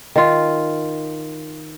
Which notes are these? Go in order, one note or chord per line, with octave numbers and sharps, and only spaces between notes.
D#3 F4